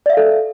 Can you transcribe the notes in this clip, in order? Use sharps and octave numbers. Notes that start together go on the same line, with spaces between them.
A4 D5 E5 F5